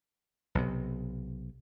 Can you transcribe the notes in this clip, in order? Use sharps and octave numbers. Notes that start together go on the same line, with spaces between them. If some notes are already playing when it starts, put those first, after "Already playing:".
B1 C3